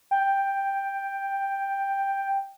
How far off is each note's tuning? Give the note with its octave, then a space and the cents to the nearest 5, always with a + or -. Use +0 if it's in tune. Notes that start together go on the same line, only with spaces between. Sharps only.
G5 +5